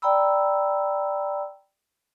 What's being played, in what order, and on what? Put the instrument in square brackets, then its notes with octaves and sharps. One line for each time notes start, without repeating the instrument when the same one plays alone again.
[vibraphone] D5 G5 A#5 B5 E6